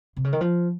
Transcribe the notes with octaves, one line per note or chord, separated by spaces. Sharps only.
C3
C#3
D#3
F3